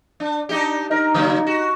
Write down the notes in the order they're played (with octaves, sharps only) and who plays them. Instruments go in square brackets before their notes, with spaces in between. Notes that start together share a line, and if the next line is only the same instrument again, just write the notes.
[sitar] D4
D4 D#4 G4
[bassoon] D#4 [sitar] A#4
[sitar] C#3 F#3 A#3
F#4